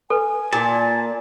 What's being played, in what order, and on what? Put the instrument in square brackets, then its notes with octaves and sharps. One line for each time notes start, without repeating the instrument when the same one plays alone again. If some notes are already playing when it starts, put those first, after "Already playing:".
[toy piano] A4 B4 [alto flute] G#5
[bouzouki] A#2 [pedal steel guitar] A5